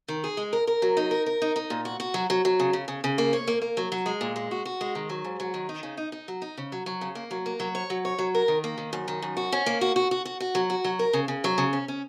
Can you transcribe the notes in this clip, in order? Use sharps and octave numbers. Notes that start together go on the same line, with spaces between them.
D#3
G#4
G#3
A#4
A#4
F#3
D#4
A#4
A#4
D#4
D#4
A#2
F#4
F#4
F#3
F#3
F#3
C#3
C#3
C#3
C#3
A#3
C#5
A#3
A#3
F#3
F#3
G#3
A#2
G#3
F#4
F#4
G#3
D#3
F#3
G#2
F#3
D#3
D#4
C#3
D#4
D#4
F#3
D#4
C#3
F#3
F#3
C#3
A#3
F#3
A#3
F#3
C#5
F#3
C#5
F#3
A#4
D#3
A#3
D#3
F#2
D#3
F#2
F#4
C#4
A#3
F#4
F#4
F#4
F#4
F#4
F#3
F#4
F#3
A#4
C#3
C#3
F#3
C#3
C#4
C#4